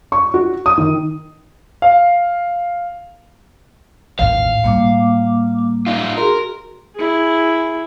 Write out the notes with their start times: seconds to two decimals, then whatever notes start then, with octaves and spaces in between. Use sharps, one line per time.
0.12 C#6
0.34 F#4
0.66 D#6
0.78 D#3
1.82 F5
4.19 A1 D#2 F5
4.64 A2 G3 A#3 D6
5.86 D#4 F4
6.17 F#4 G#4 A#4 C6
6.96 E4 G#4